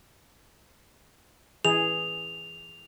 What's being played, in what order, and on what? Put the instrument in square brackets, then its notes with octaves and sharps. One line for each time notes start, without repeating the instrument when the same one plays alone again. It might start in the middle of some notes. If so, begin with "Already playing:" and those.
[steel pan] E3 G#4 [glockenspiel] F7